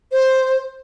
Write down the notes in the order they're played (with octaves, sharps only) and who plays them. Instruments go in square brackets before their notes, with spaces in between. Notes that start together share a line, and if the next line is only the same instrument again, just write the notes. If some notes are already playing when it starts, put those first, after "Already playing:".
[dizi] C5